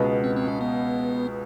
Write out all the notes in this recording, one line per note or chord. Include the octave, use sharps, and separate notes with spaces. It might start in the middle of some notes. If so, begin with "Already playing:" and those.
Already playing: C#2 B2 G#3 B3
C4
C4
C#4
B3